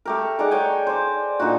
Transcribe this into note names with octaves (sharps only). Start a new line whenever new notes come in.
A3 G4 A#4
D#4 G#4 D5 F#5
C#5 G5 G#5
C5 D5
A#2 D3 D#4 F#4